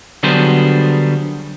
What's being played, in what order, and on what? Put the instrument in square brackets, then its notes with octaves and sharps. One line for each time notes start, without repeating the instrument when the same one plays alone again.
[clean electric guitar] D3 F#3 G3 B3 G#4 C5